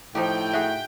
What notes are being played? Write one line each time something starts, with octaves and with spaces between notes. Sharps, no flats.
A2 F3 D#4 G4 G5
F#4 G#4 E5